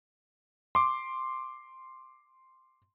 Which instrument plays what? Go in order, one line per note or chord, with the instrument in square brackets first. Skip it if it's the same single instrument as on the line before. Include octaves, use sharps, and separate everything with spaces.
[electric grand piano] C6 D6